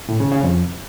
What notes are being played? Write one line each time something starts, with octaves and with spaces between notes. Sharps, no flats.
A2
C#3
C#3
F2